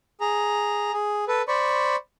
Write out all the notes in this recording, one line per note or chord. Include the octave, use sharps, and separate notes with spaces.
G#4 A#5
G#4
A4 B4
C5 D5 B5 C#6